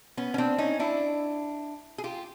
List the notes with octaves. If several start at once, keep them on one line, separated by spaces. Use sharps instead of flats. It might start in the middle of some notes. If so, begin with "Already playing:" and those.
B3 C#4
C#4
C4 D4
C#4 D#4
D4 E4
G#4
F4 G4